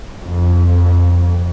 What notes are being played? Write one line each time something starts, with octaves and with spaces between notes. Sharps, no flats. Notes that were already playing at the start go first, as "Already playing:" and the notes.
F2